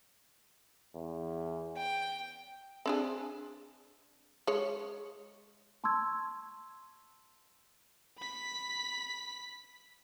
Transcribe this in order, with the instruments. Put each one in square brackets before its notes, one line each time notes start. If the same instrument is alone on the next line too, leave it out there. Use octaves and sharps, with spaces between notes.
[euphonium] E2
[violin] G5
[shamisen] C4 D4 G#4
G#3 C#5
[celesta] A5 C6 C#6 E6 G#6
[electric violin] B5 B6